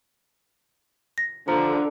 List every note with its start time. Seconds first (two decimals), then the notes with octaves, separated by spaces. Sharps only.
1.18 A#6
1.48 D3 F3 A#5